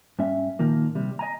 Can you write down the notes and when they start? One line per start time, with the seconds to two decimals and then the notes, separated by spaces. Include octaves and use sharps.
0.19 G2 C#4 E5
0.59 A#2 D#3 F3 A#3
0.95 C3 G3
1.19 D#5 G#5 A#5